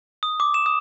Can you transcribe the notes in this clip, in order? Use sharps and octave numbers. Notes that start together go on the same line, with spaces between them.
D#6
D6
E7
D#6